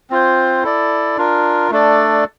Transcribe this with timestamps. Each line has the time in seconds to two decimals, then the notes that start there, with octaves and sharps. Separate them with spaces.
0.10 C4 F4 C5
0.63 E4 A4 D5
1.17 D4 F4 A#4
1.71 A3 D4 A4 D5